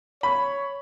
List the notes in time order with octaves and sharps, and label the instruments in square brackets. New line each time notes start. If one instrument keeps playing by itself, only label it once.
[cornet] C#5 [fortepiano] B5